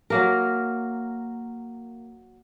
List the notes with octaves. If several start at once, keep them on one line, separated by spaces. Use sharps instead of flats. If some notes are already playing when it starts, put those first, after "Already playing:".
F#3 A#3 A#4